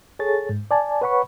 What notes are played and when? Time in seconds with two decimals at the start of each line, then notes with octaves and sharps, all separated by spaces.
0.19 G#4 A4 C#5 A6
0.49 G#2
0.71 D5 G#5 A5
1.02 B4 C#5 F#5 B5 C#6